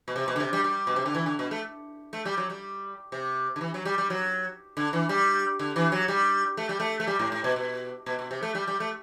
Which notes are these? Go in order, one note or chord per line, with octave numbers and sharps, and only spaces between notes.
B2
C3
B2
D3
C3
G3
G3
B2
C3
D3
E3
D3
B2
A3
A3
G3
F#3
G3
C3
D3
E3
F#3
G3
G3
F#3
D3
E3
G3
D3
E3
F#3
G3
A3
G3
A3
A3
G3
A2
A2
B2
B2
B2
B2
C3
A3
G3
G3
A3